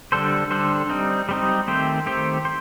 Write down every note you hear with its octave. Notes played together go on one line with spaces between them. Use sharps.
D3 G3 D4 A4 C5
D3 G3 D4 A4 C5
G3 C4 D#4
G3 C4 D#4
D#3 A3 C4 G4 C5
D#3 A3 C4 G4 C5
C5